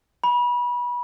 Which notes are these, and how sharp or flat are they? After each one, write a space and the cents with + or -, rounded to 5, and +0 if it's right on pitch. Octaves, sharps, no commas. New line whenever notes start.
B5 -25